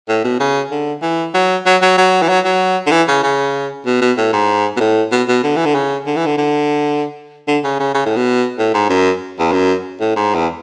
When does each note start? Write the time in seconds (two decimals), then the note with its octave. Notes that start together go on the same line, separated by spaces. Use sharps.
0.09 A2
0.24 B2
0.40 C#3
0.71 D3
1.02 E3
1.34 F#3
1.66 F#3
1.82 F#3
1.98 F#3
2.22 E3
2.29 F#3
2.45 F#3
2.86 D3
2.91 E3
3.08 C#3
3.23 C#3
3.86 B2
4.01 B2
4.17 A2
4.33 G#2
4.77 B2
4.80 A2
5.12 B2
5.28 B2
5.43 D3
5.56 E3
5.66 D3
5.75 C#3
6.06 D3
6.16 E3
6.26 D3
6.38 D3
7.48 D3
7.64 C#3
7.80 C#3
7.95 C#3
8.06 A2
8.16 B2
8.58 A2
8.74 G#2
8.89 F#2
9.39 E2
9.52 F#2
10.00 A2
10.16 G#2
10.35 E2